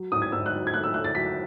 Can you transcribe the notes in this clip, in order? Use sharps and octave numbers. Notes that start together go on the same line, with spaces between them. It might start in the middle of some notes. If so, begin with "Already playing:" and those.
Already playing: F#3
G#2 D#6
G#6
G#2 E6
F#6
F#3
G#6
A3 F#6
E6
A3 F#6
A6
F#3 B6